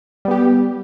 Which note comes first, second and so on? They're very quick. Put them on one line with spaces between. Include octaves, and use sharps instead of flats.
G3 B3 G4